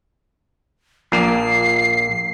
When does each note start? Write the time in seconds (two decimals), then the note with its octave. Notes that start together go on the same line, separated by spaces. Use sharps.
1.12 A#1 A#2 A#3 C7